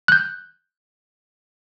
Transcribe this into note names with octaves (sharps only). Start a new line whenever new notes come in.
F#6 G6